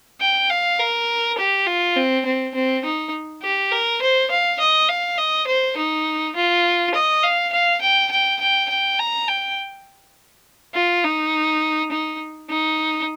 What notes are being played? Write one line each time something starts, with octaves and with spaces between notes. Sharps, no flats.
G5
F5
A#4
G4
F4
C4
C4
C4
D#4
G4
A#4
C5
F5
D#5
F5
D#5
C5
D#4
F4
D#5
F5
F5
G5
G5
G5
G5
A#5
G5
F4
D#4
D#4
D#4